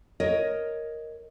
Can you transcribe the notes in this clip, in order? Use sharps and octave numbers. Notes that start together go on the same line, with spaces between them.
A#4 C#5 D#5